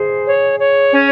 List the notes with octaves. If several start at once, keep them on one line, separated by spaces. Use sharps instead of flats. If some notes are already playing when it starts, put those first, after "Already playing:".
Already playing: G#4 C5
C#5
C#5
C#4